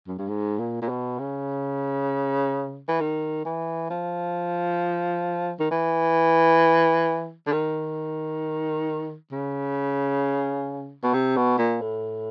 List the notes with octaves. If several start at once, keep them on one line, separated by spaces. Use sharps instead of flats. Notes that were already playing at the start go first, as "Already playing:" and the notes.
F#2
G2
G#2
A#2
A#2
B2
C#3
E3
D#3
E3
F3
D#3
E3
D3
D#3
C#3
B2
C3
B2
A#2
A2